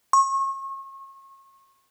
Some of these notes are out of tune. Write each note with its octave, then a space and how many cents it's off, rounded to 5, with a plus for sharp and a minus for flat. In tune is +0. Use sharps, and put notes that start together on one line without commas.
C#6 -35